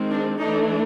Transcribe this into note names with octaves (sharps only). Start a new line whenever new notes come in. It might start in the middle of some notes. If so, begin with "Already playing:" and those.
Already playing: D#3 G#3 C4
D4
E3 A3 D4 D#4